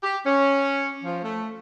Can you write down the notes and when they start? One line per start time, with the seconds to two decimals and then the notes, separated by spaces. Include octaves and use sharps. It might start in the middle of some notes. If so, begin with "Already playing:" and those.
0.03 G4
0.25 C#4
1.04 F3
1.23 A3